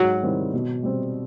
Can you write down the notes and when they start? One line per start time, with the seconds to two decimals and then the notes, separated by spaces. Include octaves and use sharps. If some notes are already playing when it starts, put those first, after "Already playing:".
Already playing: G#2 F#3
0.23 D#3 G3 C4 E4
0.54 B2
0.83 G3 C4